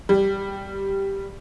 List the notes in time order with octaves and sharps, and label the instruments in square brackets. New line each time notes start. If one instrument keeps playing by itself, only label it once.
[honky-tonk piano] G3